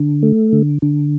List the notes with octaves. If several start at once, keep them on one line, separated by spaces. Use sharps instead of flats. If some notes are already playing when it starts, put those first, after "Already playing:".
Already playing: D3
A3
D3
D3